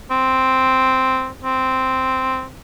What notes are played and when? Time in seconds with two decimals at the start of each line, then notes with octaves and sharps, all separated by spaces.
0.11 C4
1.43 C4